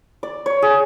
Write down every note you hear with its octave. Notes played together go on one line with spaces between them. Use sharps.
D5
C#5
G#4